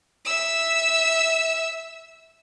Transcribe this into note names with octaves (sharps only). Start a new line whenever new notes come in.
E5 E6